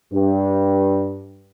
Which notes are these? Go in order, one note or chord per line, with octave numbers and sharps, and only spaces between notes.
G2